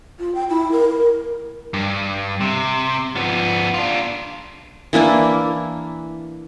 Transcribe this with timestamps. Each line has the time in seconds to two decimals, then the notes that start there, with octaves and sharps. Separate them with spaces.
0.20 F4
0.35 G5
0.50 E4
0.72 A#4
0.89 A#4
1.74 G2
2.41 C3
3.16 F3 B3
3.74 D4 F4
4.93 E3 A#3 D4 E4